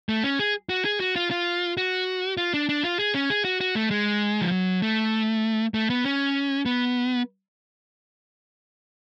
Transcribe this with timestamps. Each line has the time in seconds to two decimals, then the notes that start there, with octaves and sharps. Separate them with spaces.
0.09 A3
0.24 C#4
0.39 G#4
0.69 F#4
0.85 G#4
1.00 F#4
1.16 F4
1.31 F4
1.77 F#4
2.37 F4
2.54 D4
2.69 D4
2.83 F4
2.99 G#4
3.14 C#4
3.30 G#4
3.45 F#4
3.61 F#4
3.75 A3
3.91 G#3
4.41 F3
4.52 F#3
4.82 A3
5.74 A3
5.90 B3
6.05 C#4
6.66 B3